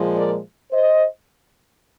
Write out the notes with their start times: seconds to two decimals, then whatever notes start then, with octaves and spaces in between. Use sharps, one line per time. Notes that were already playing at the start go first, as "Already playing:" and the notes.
Already playing: A#2 F3 G#3
0.16 A#4 D5
0.71 C5 D#5